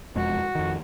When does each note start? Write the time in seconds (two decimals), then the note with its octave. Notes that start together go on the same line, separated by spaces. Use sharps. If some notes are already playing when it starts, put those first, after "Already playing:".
0.15 E1 F2 G#3 F#4
0.55 F2 D#3